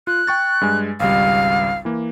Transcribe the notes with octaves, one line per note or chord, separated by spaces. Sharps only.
F4 F#6
G5 C#6 A6
G2 G#3 G#5
G#1 C#2 G3 F5
E3 A#3